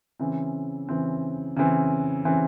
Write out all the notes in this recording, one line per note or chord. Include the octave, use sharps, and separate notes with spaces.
C#3 E3 C4
C#3 E3 C4
C#3 E3 C4
C#3 E3 C4